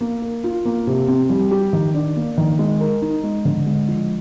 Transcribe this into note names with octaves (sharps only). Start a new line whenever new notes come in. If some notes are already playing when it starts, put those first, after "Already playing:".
A#3
A#4
F4
A#3
C3
C4
G3
G4
D#3
D4
A#3
D#3
G#3
A#4
D#4
G#3
D3
G#3
F3